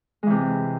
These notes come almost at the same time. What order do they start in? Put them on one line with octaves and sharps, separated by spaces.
G#3 E3 C3